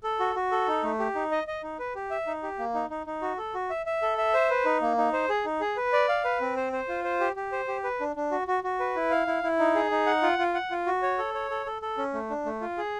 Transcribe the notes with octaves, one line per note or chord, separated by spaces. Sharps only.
A4
F#4
F#4
A4
D#4
A3
G4
D#4
D#5
D#5
D#4
B4
G4
E5
D#4
G4
A#3
D#4
D#4
D#4
F#4
A4
F#4
E5
E5
A4
E5
C5
B4
D#4
A#3
D#4
C5
G#4
D#4
G#4
B4
D5
F5
B4
C4
C5
C5
F4
C5
G4
G4
C5
G4
B4
D4
D4
F#4
F#4
F#4
B4
E4
F5
E4
E4
D#4
G#4
D#4
F#5
F4
F4
F#5
F4
F#4
C#5
A4
C#5
A4
A4
A4
C#4
A3
D4
A3
F4
G#4